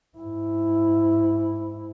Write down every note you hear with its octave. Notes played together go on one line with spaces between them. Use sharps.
G#2 E4